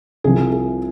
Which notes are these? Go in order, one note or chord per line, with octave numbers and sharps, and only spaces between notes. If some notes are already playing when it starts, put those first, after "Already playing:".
C2 C3 F3 G#4
G#4